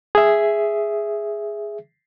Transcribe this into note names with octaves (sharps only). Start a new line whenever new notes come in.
G#4 E5